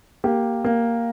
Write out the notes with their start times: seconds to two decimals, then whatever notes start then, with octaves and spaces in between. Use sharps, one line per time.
0.24 A#3 G4
0.64 A#3